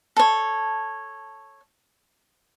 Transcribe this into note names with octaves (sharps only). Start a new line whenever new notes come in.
A4 C#5